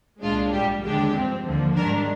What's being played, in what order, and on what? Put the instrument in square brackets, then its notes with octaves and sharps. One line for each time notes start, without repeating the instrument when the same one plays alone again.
[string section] C2 A#2 G#3 D4 F4
A#1 G#2 G3 G4
D#2 D3 G#3 D4 G4
G2 F3 C4
D#2 D3 F3 A#3
G#2 D#3 G3 D4 A#4